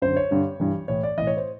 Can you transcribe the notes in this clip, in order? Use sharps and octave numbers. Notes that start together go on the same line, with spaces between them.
F#2 D3 C5
C#5
G2 D3
G2 E3
A2 E3 C#5
D5
A2 E3 D#5
C#5
C5